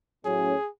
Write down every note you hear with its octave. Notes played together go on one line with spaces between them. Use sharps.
A2 F#3 A3 C#4 G#4